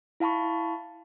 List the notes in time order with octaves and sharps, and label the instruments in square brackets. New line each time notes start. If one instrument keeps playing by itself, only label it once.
[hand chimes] E4 F5 A5 B5 C#6